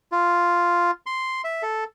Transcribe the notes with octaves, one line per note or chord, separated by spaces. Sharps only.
F4
C6
E5
A4